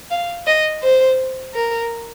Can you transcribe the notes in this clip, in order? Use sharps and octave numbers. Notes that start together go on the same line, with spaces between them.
F5
D#5
C5
A#4